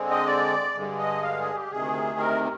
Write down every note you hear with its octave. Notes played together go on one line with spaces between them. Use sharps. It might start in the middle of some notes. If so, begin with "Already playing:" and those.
Already playing: D3 G#3 C4
D#5
D5
G2 D3 G#3
D#5
F5
G#4
G4
D2 C3 D#3 G#4
A#4